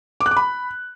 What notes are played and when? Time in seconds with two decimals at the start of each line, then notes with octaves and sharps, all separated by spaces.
0.21 D6
0.26 F#6
0.31 D6
0.37 B5